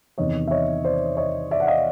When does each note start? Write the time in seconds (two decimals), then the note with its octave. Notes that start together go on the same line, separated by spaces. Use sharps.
0.18 E2 C3 D#3 C#5 D#5
0.47 E5
0.51 C#5 D#5
0.85 C5 D5
1.17 C#5 D#5
1.51 D5 E5
1.60 F#5
1.67 D#5 F5